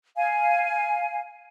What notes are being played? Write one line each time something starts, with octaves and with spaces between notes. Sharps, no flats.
F5 G#5